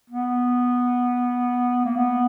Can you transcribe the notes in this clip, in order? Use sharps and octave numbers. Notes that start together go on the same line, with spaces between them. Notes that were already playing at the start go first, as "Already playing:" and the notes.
B3
A#3
B3